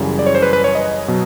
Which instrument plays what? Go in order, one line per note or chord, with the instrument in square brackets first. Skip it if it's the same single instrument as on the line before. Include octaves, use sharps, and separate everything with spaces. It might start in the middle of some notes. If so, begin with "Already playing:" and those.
Already playing: [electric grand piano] F#2 C#3 E3 G3
D5
C#5
C5
B4
B4
C#5
D#5
B2 F#3